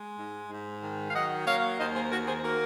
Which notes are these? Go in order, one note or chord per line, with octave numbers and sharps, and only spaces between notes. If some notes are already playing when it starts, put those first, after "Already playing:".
Already playing: G#3
G#2
G#2
D#3
F5
F#3 D#5 F#5
A#3 C#5 F5
D#2 C5 D#5
G#4 C5
D#3 F#4 A#4
G#4 C5
A#3 F#4 A#4